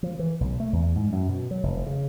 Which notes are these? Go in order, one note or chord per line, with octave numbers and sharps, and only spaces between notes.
F3
E3
B1
A3
E2
G#2
F#2
B2
F#3
F1
C#3